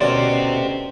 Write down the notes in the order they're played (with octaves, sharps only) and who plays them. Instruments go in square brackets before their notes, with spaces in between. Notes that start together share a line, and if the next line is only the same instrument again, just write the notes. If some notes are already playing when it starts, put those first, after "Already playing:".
[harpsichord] D2 B2 [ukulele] C#4 D5 [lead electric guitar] G4 C5